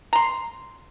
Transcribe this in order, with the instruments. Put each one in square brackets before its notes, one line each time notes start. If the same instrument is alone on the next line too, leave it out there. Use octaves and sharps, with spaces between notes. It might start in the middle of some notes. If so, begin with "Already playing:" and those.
[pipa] A#5 C6